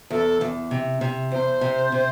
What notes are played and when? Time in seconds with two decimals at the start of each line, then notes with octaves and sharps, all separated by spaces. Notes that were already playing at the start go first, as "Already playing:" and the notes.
0.10 E2 A4
0.41 E2
0.71 C3
1.01 C3
1.31 E2 C5
1.61 C3
1.92 C3